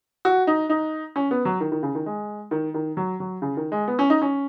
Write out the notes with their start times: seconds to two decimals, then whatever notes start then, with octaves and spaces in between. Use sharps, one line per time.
0.25 F#4
0.47 D#4
0.69 D#4
1.16 C#4
1.31 B3
1.45 F#3
1.60 D#3
1.72 D#3
1.83 C#3
1.95 D#3
2.06 G#3
2.51 D#3
2.74 D#3
2.97 F#3
3.20 F#3
3.42 C#3
3.57 D#3
3.72 G#3
3.88 B3
3.99 C#4
4.10 D#4
4.22 C#4